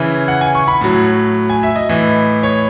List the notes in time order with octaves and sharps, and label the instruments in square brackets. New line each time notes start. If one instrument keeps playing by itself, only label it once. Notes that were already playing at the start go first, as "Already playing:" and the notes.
Already playing: [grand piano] C#3 E3 E5
F#5
G#5
C#6
B5
A2 F#3
G#5
E5
D#5
A2 E3
C#5